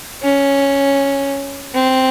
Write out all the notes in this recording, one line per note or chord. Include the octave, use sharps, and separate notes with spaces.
C#4
C4